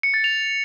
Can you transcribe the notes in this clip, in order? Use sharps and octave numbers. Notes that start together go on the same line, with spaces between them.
C#7
A6
F7